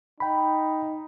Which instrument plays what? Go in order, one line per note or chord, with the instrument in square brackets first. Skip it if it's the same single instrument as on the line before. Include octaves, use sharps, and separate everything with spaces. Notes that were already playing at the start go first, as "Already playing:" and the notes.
[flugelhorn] D#4 [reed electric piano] G5 B5